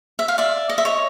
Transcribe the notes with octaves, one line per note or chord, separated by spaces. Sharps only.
E5
F5
D5 E5
D#5
E5
C#5 D#5